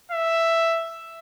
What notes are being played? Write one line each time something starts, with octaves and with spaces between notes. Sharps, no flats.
E5